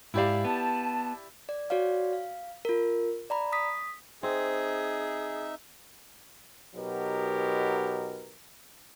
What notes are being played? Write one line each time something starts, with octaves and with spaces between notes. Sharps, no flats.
G#2 E4 G4 D5 F5
B3 A5
D5
F#4 C#5 D5 F5
F5
F4 A#4
D5 A#5 B5
D#6 B6
C4 D#4 G#4 E5
B2 F#3 D#4 G4 A#4 B4